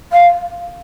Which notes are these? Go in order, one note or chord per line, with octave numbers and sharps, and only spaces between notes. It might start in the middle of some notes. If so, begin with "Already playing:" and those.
F5